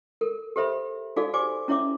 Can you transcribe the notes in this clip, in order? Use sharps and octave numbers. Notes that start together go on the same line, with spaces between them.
A4 A#4
G4 A4 C5 E5 B5
D#4 F#4 G#4 A4 D5 F5
G4 C5 D5 G#5 D6
C#4 E4 C#5 E5 D6